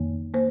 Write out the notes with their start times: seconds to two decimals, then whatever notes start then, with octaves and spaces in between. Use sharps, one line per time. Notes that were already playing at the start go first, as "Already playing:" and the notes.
Already playing: F2 D#3 A#3
0.34 A#3 C5